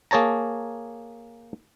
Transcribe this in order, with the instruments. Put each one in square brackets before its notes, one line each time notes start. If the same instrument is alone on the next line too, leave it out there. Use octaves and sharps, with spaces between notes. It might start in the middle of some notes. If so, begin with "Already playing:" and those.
[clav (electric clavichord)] A#3 G#4 C#5 A5 A#5